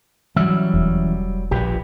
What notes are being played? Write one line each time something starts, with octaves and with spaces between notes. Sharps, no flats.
E3 F#3 G3 C#4 E5
E1
A#1 A#2 G4 B4